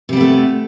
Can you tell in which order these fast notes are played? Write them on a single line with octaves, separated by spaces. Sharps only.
C3 G3 B3 A3